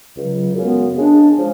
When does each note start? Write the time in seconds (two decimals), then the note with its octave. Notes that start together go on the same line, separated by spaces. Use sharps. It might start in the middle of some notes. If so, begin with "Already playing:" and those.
0.16 C#2 C#3 F#3
0.56 F#2 C#3 G#3 B3
0.96 C#3 G#3 D4
1.37 C#3 F3 G#3 C#4